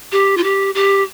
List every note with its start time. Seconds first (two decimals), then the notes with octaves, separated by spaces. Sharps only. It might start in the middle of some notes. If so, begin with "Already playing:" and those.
0.12 G4
0.37 F4
0.43 G4
0.75 G4